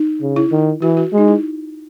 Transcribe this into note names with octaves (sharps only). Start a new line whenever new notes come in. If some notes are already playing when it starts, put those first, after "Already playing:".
Already playing: D#4
C#3
E4
D#3
E3 F#4
F#4
G#3
D#4
E4